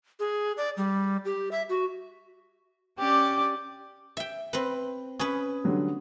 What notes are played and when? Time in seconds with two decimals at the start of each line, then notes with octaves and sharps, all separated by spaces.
0.20 G#4
0.57 D5
0.77 G3
1.25 G4
1.52 E5
1.69 F#4
2.99 C#4 G4 D5
4.17 E5 G5
4.53 C4 B4
5.19 C#4 B4 D#6
5.64 D3 F#3 G3